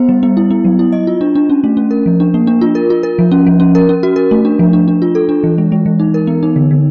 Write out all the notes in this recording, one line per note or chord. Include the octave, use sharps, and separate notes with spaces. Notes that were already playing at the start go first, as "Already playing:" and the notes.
Already playing: B3 C5
G3
B3
E4
B3
F#3
E4
D#5
F4
D4
D4
C#4
A3
C#4
A#4
F3
D4
A#3
D4
F4
A#4
F4
A#4
F3
C#4
F3
C#4
A#4
C#4
F#4
A#4
A3
D4
F3
D4
D4
F4
A4
D4
E3
G#3
G#3
E3
D#4
A#4
B3
D#4
D3
D3